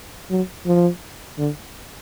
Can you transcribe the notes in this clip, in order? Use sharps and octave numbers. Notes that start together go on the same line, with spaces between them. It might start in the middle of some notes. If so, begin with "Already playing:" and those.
F#3
F3
D3